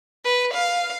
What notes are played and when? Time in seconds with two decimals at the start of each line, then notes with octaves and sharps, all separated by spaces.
0.24 B4
0.54 F5